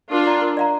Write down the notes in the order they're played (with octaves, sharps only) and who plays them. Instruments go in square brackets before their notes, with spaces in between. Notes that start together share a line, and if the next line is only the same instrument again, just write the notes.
[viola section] D4 F4 [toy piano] A#4
[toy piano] D5 F5 A#5
A#4
D5 F5 A#5